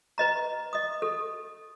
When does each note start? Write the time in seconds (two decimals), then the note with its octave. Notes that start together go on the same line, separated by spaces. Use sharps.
0.18 B4 D#5 A#5
0.73 D#5 D#6
1.02 A4